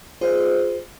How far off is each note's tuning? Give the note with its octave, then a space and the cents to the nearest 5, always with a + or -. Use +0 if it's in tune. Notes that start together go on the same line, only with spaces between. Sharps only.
F4 +15 G#4 +0 C5 -20